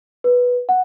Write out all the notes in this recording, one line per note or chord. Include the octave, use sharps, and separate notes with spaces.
B4
F#5